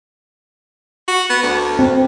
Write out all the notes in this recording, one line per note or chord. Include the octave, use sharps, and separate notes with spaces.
F#4
B3
D2
C4